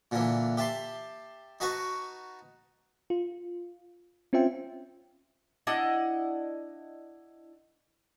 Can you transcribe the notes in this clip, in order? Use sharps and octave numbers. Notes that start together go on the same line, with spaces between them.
A#2 D3 E3
G4 E5 A5 C6
D#4 F#4 B4 F#5 A5 C#6
F4
C4 C#4 F4 C5 E5 G5
D4 E4 D#5 F#5